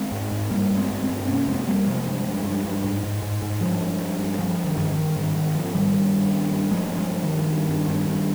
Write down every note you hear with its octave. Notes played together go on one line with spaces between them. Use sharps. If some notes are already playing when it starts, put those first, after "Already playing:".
Already playing: G#3 C4
G#2
G#2
G2 G3 A#3
G2
G#3 C4
G2
G#3 C4
G2
C3 A#3 C#4
F2 G#3 C4
F2 G3 A#3
C3 F3 G#3
G2
G2
G2
G2
G#2
G#2
G#2
G#2
G2 F3 G#3
G2
G2
G2
G2 F3
G2
D#3
G2 D#3
D#3
G2
G#2 D#3
G#2 D#3
G#2 F3
G#2 D#3 G3
G2
G2
G2
G2
G2 F3 G#3
A#3
G2
F3 G#3
G2
D#3
G2
G2
G2
G2
G2